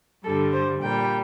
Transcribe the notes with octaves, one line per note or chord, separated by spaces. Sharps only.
G2 D3 G3 A4
C5
A#2 G3 G5